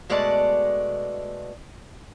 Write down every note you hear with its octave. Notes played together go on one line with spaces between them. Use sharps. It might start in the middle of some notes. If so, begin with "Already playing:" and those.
B2 G#3 A3 D5 F#5 A5